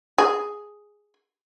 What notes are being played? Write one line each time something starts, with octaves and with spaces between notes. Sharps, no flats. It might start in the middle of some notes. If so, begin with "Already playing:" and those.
G#4